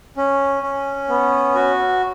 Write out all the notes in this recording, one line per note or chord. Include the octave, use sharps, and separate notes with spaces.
C#4
C#4
B3
F#4